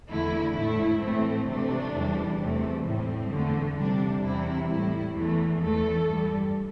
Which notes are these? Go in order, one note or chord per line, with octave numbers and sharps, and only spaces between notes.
E2 D3 A3 E4
A2 A3 E4
A2 E3 A3 C4
C3 E3 A3 D4
E2 E3 G3
E2 C3 A3
A2 G3 C4
E2 D3 A3
C3 G3 D4
E2 C3 E3 E4
A2 G3 E4
E2 E3 A3
E2 E3 A3 A4
G2 G3